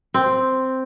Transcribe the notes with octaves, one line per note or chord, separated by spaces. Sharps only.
C4